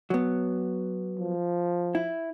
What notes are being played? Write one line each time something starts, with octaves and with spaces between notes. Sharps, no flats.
F#3 B3
F3
E4